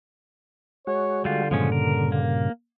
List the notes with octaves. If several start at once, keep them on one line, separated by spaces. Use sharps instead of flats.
G#3 F#4 C#5
D3 G3 F4
G2 A#2 C#3 F3 G#3 C#4
A#4
A#3